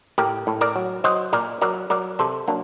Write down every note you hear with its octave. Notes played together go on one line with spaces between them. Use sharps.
A2 G4 A#4
A2
A#4 D5
F#3
F#3 C5 D#5
A#2 A#4 D5
F#3 A#4 D5
F#3 A#4 D5
C3 A4 C5
F#3 A#3 D4